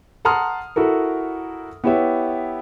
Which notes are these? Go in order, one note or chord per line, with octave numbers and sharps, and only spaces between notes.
F#5 A5 A#5 C6 D#6 F6
E4 F#4 A4 A#4
B3 E4 G4 C#5 E5